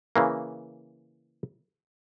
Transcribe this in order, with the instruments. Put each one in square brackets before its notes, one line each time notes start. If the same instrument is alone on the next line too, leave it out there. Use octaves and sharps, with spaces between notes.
[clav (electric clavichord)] C#3 E3 A#3